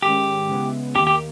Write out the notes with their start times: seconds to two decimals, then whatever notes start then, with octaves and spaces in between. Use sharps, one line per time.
0.02 G#2 D#3 G#3 C#4 G4
0.49 C#3 G#3 B3 E4
0.95 D#2 D#3 A#3 G4
1.07 G4